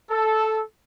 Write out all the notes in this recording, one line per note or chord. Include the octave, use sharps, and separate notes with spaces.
A4